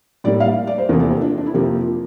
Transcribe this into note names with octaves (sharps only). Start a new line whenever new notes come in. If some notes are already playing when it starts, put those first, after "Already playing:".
A2 G3 A#3 D5
F5
D5
C5
E2 C3 F3 A#3 A#4
A4
G4
D4
D4
E4
F2 C3 F3 A#3 G4